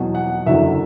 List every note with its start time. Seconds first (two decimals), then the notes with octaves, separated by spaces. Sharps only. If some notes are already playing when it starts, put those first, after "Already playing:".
Already playing: E2 B2 F#3
0.15 F#5
0.46 F#1 E2 D3 F#3 E5